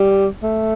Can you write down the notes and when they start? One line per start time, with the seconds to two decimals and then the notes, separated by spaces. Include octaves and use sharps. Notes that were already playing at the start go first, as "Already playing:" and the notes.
Already playing: G3
0.42 A3